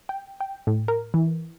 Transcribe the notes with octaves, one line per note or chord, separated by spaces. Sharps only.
G5
G5
A2
A#4
E3